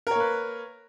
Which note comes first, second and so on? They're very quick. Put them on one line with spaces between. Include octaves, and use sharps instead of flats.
A#4 C#5 A#3 B4